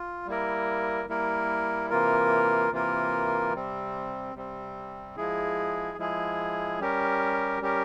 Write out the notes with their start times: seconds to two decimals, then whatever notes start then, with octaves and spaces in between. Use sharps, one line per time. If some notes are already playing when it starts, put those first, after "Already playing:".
Already playing: F4
0.26 G3 A#3 E4 A#4
1.09 G3 A#3 E4 A#4
1.90 C3 E3 A#3 F4 A#4
2.71 C3 E3 A#3 F4 A#4
3.54 C3 G3 C4
4.35 C3 G3 C4
5.17 F3 G#3 E4 G#4
5.98 F3 G#3 E4 G#4
6.79 G3 C#4 G4 A#4
7.61 G3 C#4 G4 A#4